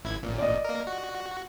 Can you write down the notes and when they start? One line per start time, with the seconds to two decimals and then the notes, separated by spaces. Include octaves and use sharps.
0.05 A1 E4 G#6
0.22 A1 A#2
0.38 D5 D#5
0.65 A#3 A#4
0.87 F#4